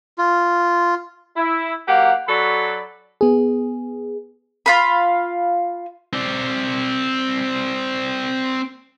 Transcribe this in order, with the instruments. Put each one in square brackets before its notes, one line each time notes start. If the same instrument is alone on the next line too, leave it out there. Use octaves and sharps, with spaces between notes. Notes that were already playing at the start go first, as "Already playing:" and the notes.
[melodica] F4
[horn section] E4
F#3 A#3 G4 F5 F#5
F#3 F#4 A4 D5 B5
[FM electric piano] B3 G#4
[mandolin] F4 F5 B5
[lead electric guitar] C4 D5